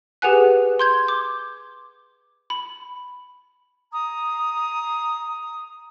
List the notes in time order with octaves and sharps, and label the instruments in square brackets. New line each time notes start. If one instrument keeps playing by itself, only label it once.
[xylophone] G4 G#4 B4 F#5 G#5 F#6
C6 G6 G#6
D6
B5
[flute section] A#5 D#6